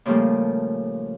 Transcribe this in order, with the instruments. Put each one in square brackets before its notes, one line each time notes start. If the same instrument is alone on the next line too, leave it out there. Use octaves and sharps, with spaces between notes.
[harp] A#2 C#3 F3 G3 A3 A#3